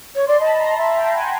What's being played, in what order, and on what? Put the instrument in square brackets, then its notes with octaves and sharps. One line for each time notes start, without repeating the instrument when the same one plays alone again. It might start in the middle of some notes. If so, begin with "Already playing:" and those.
[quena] C#5
[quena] D5 [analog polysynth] C6
[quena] D#5 [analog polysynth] A5 B5
[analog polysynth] A#5 C6
[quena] E5 [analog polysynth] A5 B5
[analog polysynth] G5 A5
A5
F#5 G#5